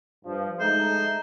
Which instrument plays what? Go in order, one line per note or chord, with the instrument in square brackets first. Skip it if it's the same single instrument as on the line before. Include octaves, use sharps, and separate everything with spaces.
[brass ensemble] G2 F3
[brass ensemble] G#3 A3 D#4 [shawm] C5